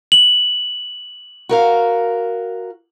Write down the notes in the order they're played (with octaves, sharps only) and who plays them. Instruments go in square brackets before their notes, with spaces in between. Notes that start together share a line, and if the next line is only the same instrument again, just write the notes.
[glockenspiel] F#7
[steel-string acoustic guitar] F#4 A#4 F5